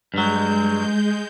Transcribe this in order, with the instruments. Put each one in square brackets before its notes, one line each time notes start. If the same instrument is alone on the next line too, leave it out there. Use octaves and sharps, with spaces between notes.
[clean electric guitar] G2 F#3 [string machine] G#3 G6